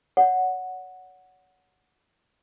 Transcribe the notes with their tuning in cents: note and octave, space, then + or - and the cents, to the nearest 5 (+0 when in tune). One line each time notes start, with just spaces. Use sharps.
C#5 +30 F#5 -5